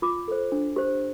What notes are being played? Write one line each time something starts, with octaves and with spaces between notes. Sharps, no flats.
F4 D6
A4 C5
D4
G4 C5